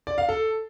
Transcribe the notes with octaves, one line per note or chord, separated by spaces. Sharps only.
D5
F5
A4